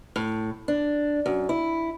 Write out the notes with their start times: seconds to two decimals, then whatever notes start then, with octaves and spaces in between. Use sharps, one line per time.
0.16 A2
0.68 D4
1.26 F#2
1.49 E4